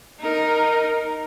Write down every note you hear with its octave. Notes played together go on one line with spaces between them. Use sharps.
D#4 A#4